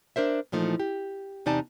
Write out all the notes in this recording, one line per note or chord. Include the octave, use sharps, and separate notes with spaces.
D4 A#4 C5 E5
A#2 E3 F3 A3 D#4
G4
E2 C3 D#4 D5 G#5 A5